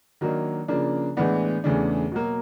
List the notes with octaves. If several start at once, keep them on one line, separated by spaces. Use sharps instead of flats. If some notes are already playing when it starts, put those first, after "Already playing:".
D#3 F#3 A#3 D4
C#3 F3 A#3 D4
A2 E3 G#3 B3 D4
E2 C#3 E3 A3 D4
B2 F#3 A#3